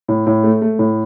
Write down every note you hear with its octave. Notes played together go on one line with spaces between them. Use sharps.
A2
A2
A3
A3
A2